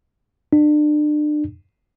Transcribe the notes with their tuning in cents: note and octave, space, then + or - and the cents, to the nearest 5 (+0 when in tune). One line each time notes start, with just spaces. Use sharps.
D4 +35